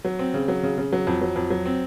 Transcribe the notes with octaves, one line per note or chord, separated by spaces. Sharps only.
F#3
C4
C#3
F#3
C#3
C#3
F#3
F2
F#3
F2
F#3
C4